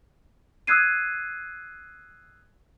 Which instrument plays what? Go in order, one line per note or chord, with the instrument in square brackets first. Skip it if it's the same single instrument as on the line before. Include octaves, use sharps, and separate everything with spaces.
[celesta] D#6 E6 F#6 G#6 C7 D#7